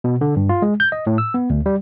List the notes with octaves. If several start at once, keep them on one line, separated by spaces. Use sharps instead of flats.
B2
D3
G2
F4
G#3
G6
D#5
A2
E6
B3
D2
G3